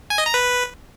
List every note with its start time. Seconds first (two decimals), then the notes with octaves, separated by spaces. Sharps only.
0.10 G#5
0.18 D#5
0.26 A#5
0.34 B4